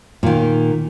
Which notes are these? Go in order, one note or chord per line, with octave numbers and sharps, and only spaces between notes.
A#2 D#3